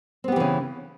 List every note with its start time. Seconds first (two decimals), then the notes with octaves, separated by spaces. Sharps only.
0.24 C4
0.28 B3
0.32 G4
0.36 E3
0.40 C#3